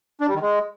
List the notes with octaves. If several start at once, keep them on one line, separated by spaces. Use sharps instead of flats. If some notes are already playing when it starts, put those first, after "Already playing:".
D4
G3
D#3
G#3